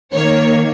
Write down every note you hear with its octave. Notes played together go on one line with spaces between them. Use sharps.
D#3 A#3 C#5